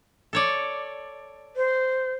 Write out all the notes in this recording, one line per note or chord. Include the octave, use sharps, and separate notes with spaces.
A4 C#5 D5
C5